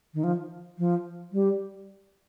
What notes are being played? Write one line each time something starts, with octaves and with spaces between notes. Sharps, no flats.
D#3
F3
F3
G3